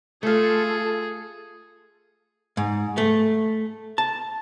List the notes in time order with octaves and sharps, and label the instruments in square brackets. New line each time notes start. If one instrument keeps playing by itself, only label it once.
[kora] A3 F5 [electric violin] F4 A4 [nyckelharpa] G#4
[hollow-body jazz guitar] G#2
A3
A5